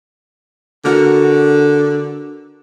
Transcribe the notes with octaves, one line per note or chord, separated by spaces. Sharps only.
D3 F#4 A#4